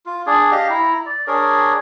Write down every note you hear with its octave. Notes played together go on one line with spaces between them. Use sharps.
F4
D4 G#4
G4 D#5 F5
E4 A#5
D5
D4 G#4 A#4 C#5